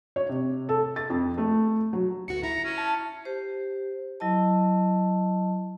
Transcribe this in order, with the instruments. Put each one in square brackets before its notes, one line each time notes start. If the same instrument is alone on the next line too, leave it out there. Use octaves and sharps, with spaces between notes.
[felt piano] C#5
C3
A4
A6
F2
A3
F#3
[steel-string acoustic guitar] D2 B3 F#4 [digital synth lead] C#7
[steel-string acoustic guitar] E4 [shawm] A#5
[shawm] C#4
[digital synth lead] A5
[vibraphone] G4 C5
F#3 E4 D#5 A5